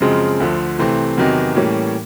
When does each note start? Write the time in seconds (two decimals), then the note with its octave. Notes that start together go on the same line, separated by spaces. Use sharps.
0.01 F#2 C#3 F3 G#3 C4
0.40 D2 D3 F3 A3
0.79 C2 C3 E3 A3 C4
1.17 E2 C3 D#3 F#3 B3
1.56 A2 E3 G3 A#3 C#4